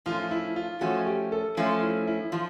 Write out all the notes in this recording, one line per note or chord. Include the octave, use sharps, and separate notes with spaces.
F3 A3 C#4 F4
E4
F4
F3 A3 C#4 F#4
G4
A4
F3 A3 C#4
E4
E4
F3 F4